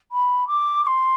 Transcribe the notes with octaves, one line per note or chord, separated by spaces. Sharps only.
B5
D6
D6
C6